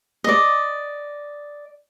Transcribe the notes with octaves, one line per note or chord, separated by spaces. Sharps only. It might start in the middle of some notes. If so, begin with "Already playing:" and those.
D5 D#5